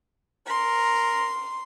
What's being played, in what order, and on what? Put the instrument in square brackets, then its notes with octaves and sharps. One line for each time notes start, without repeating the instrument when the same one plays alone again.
[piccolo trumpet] A#4 [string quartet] C6